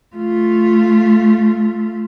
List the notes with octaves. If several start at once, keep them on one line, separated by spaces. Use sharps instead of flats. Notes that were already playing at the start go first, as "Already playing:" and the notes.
A3 F4